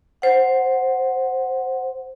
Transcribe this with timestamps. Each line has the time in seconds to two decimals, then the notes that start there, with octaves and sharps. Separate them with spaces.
0.22 C5 F#5